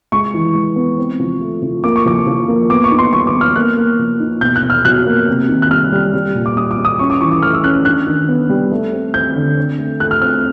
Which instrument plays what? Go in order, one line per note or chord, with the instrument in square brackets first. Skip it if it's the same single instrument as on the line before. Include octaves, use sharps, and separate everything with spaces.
[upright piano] G#3 C#6
E3
G#3
B3
C4
F3
A3
F3
A#3 D6
C#6
F3 D6
F3
A#3
B3 D6
C#6
D#4
C6
G3 C#6
D6
B3
F6
A#3 F#6
A#3
F3
D#4
B2 G6
F#6
B2
F6
F#3 F#6
A#3
C3
D#3
F#6
G3 F6
G3
G3
A#2
D6
G3 D#6
D6
G3
D#6
C#4 C#6
D6
E3 C#6
D6
A3 F6
E6
C#4 F#6
D4 F#6
D#3
B3
G3
A3
C4
C4 G6
D3
C4
A3
A3 F#6
F6
C4 F6